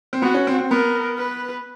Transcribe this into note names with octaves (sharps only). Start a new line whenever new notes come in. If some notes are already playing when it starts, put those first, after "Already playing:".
C4
B3 F#4
C#4
C4
C4
B3 A#4
B4